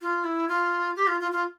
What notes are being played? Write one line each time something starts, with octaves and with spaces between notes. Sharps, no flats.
F4
E4
F4
G4
F4
F4
F4